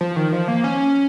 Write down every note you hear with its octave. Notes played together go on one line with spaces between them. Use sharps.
F3
D#3
F3
A#3
C#4